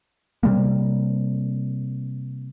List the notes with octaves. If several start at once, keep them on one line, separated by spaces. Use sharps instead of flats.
C3 G3 A#3